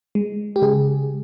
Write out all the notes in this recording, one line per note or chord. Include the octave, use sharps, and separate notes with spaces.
G#3
G4
C#3 G#4